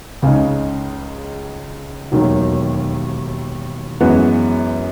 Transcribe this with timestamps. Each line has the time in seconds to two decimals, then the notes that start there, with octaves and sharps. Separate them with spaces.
0.22 C#2 C#3 G#3 D#4
2.12 E1 D#2 D#3 F#3
4.00 F#2 E3 G#3 B3 F#4